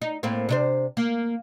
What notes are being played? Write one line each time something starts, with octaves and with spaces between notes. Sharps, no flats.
D#4
A2 A#3 C4
C3 D4 C5
A#3